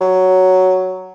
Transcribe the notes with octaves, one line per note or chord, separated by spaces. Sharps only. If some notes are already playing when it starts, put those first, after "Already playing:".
F#3